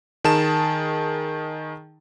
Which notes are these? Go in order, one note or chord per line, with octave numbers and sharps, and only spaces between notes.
D#3 G#4 A5 E7